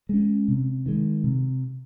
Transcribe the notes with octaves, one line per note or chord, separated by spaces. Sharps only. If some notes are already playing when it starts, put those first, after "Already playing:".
G#3 C#4
C3
D#3 G#3
C3